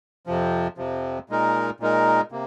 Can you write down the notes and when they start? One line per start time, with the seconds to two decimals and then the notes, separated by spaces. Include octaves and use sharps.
0.27 F2 C3 F3
0.77 F2 C3 F3
1.30 A#2 G#3 D#4 A#4
1.80 A#2 G#3 D#4 A#4
2.32 C3 A#3